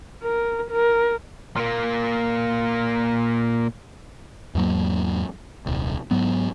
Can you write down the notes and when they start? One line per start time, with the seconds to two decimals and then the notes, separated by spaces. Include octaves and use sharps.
0.23 A#4
0.71 A#4
1.56 A#2 A#3
4.55 E2 G#2 F#3 A#3
5.66 D#1 C2
6.11 G#2 F#3 B3